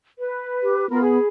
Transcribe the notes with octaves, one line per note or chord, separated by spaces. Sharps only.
B4
G4
B3 F4 A#4 B5
G#4 B5